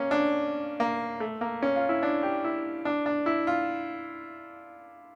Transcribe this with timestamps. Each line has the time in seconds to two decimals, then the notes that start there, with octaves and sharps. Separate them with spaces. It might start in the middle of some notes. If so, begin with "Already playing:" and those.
Already playing: A#3 C#4
0.11 D4
0.80 A#3
1.20 A3
1.41 A#3
1.63 C#4
1.76 F4
1.89 E4
2.03 D4
2.23 G4
2.44 E4
2.85 D4
3.06 D4
3.26 E4
3.47 F4